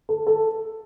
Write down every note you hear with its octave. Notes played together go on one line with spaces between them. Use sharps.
A4
A4